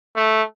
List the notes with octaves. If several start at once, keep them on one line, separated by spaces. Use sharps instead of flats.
A3